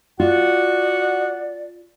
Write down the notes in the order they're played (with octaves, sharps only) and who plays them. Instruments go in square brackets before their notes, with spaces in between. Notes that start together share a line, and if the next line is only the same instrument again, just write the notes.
[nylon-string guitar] F4 [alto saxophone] F#4 [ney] D5 [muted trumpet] F#5